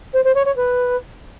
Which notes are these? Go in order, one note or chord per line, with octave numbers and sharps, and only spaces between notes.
C5
C5
C#5
C#5
B4